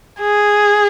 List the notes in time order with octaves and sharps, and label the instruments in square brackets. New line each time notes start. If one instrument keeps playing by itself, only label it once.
[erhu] G#4